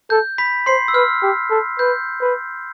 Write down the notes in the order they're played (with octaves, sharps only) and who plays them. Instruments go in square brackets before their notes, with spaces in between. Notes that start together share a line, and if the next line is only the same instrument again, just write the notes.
[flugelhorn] A4 [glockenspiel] G6
[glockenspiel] B5 B6
[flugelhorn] C5 [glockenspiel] C6 C7
[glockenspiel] E6
[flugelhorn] B4 [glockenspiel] F6
[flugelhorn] G4
A4
[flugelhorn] B4 [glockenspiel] G6
[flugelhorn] B4